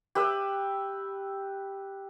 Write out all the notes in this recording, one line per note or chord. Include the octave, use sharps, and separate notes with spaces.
G4 B4 E5